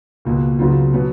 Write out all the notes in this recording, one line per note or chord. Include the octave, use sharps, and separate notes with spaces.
C#2 B2 A#3
C#2 C#3 F#3 B3 F4
B2 F#3 B3